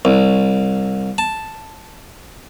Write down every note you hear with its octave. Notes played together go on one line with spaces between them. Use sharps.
C2
A5